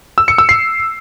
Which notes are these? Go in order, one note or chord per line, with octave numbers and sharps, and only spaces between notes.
E6
C#7
E6
C7